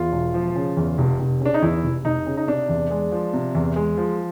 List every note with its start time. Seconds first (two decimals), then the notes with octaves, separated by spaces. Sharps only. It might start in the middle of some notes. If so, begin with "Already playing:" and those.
Already playing: E2 F4
0.12 E1
0.34 F3
0.56 C#3
0.77 E2
0.98 F1
1.19 F1
1.41 C#3 D4
1.54 D#4
1.62 E2 E4
1.84 F1
2.05 F1 D#4
2.27 C#3
2.37 D#4
2.47 C3 D4
2.69 E2
2.91 G#3
3.12 F3
3.33 C3
3.55 E2
3.76 G#3
3.98 F3